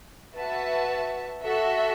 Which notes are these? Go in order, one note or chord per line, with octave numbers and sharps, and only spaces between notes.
F#4 B4 E5 A5
F#4 A4 E5